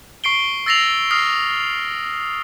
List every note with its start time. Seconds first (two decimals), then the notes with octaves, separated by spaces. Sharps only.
0.24 C#6 C7 D7 G7
0.66 E6 A6 A#6 C7 F7 F#7
1.11 D#6 F6 C7